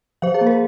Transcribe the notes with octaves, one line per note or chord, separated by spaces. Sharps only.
F3 C5 F5
G#4 C5
A#3
A#4